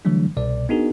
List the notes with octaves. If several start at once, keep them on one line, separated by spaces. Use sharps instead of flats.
D3 E3 F#3 G3 A3 D4
C2 B2 D5
B3 D4 D#4 F#4 G#4 A#4